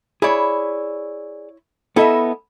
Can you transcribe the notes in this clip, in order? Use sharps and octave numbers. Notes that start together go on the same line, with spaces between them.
E4 G#4 C#5 D5
B3 E4 A4 D#5 E5